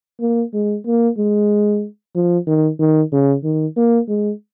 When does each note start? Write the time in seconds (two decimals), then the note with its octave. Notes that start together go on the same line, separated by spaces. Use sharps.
0.20 A#3
0.54 G#3
0.86 A#3
1.18 G#3
2.15 F3
2.47 D#3
2.79 D#3
3.12 C#3
3.44 D#3
3.77 A#3
4.08 G#3